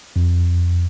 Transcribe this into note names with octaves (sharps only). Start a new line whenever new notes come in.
F2